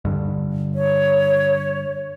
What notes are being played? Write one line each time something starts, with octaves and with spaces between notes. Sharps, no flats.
G2 D3
C#5